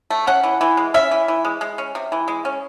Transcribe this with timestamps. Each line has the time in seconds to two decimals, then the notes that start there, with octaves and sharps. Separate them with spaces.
0.10 A3
0.27 C#4 F#5
0.43 E3
0.61 E3
0.77 G#3
0.94 C#4 E5
1.11 E3
1.28 E3
1.45 G#3
1.61 G#3
1.78 C#4
1.95 C3
2.12 E3
2.28 G#3
2.45 C#4